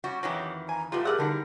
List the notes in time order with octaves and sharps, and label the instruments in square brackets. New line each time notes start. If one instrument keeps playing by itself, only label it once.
[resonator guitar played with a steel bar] G3 C#4 F#4
[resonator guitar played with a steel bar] F2 D#3 E3 [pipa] F#3 G#3 G4
[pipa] G#5 [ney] A#5
[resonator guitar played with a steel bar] A2 G3 A3 [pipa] B3 F4 [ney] G4
[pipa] B2 D5 F#5 [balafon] G#4 A#4
[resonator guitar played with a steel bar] F#2 G3 A#4 [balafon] D3 D#4 E4